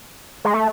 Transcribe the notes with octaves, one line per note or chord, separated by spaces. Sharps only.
G#3
A3